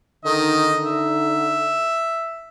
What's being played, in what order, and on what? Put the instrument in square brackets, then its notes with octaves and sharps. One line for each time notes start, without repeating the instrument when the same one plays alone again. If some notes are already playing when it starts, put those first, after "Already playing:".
[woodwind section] D3 D#4 [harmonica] D#3 D#5
[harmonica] E5